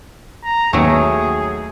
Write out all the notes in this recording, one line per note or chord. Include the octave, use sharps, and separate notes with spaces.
A#5
D#2 F#3 A3 G#4